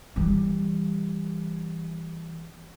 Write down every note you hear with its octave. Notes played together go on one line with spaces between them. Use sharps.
E3 G3